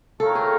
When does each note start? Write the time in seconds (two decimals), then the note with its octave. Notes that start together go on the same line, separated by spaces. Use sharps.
0.19 A3 C4 F4 A4 A#4 C#5
0.35 G#4